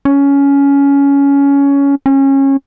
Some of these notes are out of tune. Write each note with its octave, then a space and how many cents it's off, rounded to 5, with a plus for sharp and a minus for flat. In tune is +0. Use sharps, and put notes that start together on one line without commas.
C#4 +15
C#4 -25